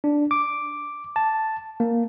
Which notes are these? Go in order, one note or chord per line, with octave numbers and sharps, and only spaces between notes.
D4
D6
A5
A#3